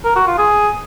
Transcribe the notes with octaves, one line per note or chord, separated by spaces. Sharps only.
A#4
F#4
F4
G#4